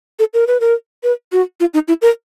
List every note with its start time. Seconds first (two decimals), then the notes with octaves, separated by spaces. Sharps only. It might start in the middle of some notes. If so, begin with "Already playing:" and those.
0.19 A4
0.34 A#4
0.47 B4
0.60 A#4
1.03 B4
1.32 F#4
1.60 F4
1.74 D#4
1.88 E4
2.02 A#4